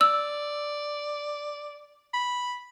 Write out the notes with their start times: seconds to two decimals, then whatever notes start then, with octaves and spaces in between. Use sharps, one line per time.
0.01 D5 E6
2.14 B5